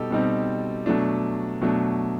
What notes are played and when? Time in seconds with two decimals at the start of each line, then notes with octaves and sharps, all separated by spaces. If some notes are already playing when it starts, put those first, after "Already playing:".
Already playing: B2 G3 D#4 G4 A4
0.11 B2 G3 C4 D#4
0.86 B2 F#3 A3 D4
1.62 B2 F#3 A3 D4